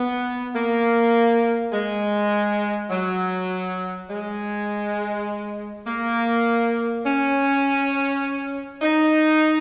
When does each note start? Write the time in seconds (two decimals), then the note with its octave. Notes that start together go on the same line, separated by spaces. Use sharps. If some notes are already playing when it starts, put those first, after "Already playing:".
Already playing: B3
0.54 A#3
1.72 G#3
2.90 F#3
4.10 G#3
5.87 A#3
7.05 C#4
8.82 D#4